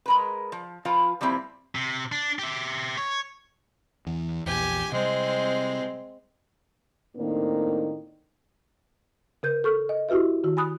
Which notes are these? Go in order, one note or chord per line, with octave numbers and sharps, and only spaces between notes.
G#3 A#4 B4
F3
F3 F4 B4
F3 G3 A#3 C4 E4
C3
D4
G4 E5
C#5
E2
A#1 E2 G4 G#5
C3 G3 G#3 C4
A2 D#3 A#3 C4 D4 D#4
C#3 A#4 G6
A4 C#6 F6
D#5
E4 F#4 G4 B4 E5
D#3 F#4
G#5 B5 D#6 F#6